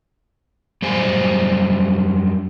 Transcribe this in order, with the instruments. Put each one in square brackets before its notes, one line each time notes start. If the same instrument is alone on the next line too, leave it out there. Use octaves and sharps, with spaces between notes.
[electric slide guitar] F#2 G3 C5 G#5